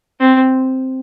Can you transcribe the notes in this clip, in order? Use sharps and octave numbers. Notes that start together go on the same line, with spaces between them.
C4